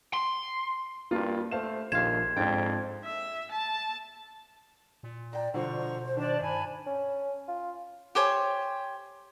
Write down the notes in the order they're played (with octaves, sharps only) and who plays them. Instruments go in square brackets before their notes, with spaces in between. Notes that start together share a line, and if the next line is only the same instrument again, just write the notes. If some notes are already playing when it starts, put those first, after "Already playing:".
[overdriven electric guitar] C6
[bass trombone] G2 [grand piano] A#3 F4 A#4
[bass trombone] A3 [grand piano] C5 F5 E7
[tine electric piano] A#1 F4 F5 [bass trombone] D#2 [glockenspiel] G#6 [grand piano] E7
[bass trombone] F2 [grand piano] G#2 D4 A6 [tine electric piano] G5
[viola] E5
A5
[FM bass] A#2
[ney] D5 [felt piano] G5 A#5
[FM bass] B2 [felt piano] D3 F3 D4 [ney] C5 [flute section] A#5 C#6
[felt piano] D#3 [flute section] D4 D5 A5
[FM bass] G2 [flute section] G#5 A5 B5
[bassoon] C#4
F4
[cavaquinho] G4 C5 C#5 G#5